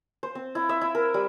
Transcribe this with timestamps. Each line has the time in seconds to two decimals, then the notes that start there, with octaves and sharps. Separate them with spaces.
0.23 C5
0.35 C4
0.55 E4
0.69 E5
0.81 E4
0.95 A#4
1.14 G3